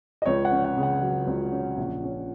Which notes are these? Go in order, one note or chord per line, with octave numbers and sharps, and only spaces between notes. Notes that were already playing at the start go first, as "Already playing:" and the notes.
D#5
C#2 C#5
F#5
C#4
F#5
C#3
F#5
F#3
C#2
C#4
A#1
C#4